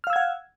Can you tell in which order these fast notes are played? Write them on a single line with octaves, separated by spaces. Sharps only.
F6 F5 E6 G#6 F#5